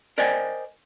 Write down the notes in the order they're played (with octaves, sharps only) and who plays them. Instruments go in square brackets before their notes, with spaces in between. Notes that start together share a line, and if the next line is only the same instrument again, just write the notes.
[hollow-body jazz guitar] A#4 C5 D5 D#5 G5 G#5